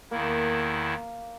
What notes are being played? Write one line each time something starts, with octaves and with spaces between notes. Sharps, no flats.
E2 D#3 A#3 E4